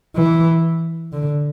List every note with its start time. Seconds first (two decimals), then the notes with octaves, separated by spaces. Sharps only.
0.16 E3
1.12 D3